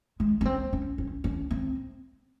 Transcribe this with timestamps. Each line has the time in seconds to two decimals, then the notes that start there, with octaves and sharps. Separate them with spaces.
0.20 G#3
0.41 C#4
0.45 C4
0.73 C#4
0.98 C#4
1.24 C#4
1.51 C4